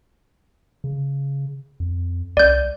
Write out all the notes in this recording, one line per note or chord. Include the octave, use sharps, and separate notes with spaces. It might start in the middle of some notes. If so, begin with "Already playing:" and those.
C#3
F2
C2 D5 G6